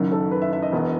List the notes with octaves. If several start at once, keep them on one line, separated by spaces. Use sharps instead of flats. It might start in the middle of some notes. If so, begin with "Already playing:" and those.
Already playing: F#1 F#2 D#3
A4
B4
E5
E5
D#5
E1 E2 B2